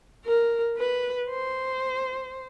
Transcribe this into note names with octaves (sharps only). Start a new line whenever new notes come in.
A#4
B4
C5